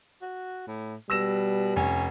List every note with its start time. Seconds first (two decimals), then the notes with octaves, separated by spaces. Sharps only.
0.22 F#4
0.67 A2
1.10 B2 G3 E6 A#6 E7
1.76 F1 C#4